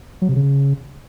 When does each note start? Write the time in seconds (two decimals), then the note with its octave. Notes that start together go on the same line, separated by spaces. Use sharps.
0.22 F#3
0.29 C3
0.36 C#3